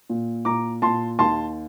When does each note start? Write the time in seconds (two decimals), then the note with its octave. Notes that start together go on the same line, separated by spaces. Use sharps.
0.10 A#2
0.45 A#2 A#5 D6
0.82 A#2 A5 C6
1.19 D#2 A5 C6